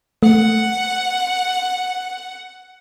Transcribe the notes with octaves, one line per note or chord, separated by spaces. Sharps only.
A3 F#5